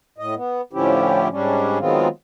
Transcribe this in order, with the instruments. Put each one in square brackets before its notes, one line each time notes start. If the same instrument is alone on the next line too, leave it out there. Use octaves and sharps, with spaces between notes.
[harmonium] A2 D#5
B3
A2 D3 F3 C#4 E4 G4
G#2 G3 C#4 D4
D#3 F#3 G#3 B3 C4 F4